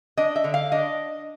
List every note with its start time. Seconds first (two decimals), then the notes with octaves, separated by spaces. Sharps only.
0.17 D4 D#5
0.36 E5
0.44 D3
0.54 F5
0.72 D4 D#5